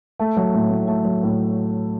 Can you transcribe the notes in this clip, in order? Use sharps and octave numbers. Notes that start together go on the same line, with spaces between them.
A3
F#3
A2
A2
A3
F#3
A2